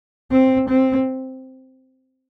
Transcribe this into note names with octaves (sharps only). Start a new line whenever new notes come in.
C4
C4